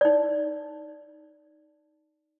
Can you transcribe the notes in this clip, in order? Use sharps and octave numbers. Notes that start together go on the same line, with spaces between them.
D#4 D5